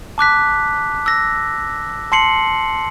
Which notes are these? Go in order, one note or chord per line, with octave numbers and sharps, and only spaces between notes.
A5 D6 F#6 B6
E6 A#6
A5 C6 C7 C#7 F#7